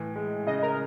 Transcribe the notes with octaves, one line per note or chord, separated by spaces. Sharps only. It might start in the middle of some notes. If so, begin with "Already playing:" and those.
Already playing: A2 E3
G#3
C#3 D#5
A#4